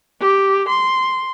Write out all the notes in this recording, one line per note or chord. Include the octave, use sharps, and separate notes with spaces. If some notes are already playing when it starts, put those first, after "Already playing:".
G4
C6